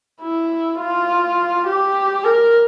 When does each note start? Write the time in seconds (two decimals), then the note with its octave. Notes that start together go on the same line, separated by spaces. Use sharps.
0.21 E4
0.79 F4
1.67 G4
2.24 A#4